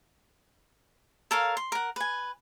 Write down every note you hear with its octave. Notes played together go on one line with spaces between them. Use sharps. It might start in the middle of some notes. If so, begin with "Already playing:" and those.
A4 A#4 C#5 F5
C6
A#4 F#5
B4 G#5